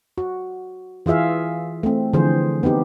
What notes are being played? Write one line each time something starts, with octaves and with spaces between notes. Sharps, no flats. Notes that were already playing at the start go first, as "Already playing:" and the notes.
F#4
E3 F4 G#4 E5 F5
A3 C4
D3 E3 F3 G#4 C5
B3 C4 D#4 G4